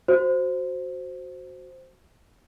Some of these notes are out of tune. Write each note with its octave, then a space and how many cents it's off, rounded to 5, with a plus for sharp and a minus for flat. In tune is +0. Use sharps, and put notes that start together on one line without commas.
F#4 +0 C5 +0